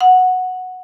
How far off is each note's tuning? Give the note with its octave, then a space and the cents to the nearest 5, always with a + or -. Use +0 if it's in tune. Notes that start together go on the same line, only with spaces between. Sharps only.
F#5 -5